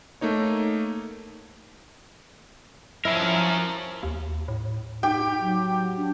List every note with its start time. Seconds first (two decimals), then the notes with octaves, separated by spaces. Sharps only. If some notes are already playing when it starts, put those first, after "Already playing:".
0.21 A3 A#3 D#4 C#5
3.05 F3 C#4 E4 A#4
4.03 D#2
4.48 A2
5.03 D#4 G4 G5
5.41 F#3
5.97 D4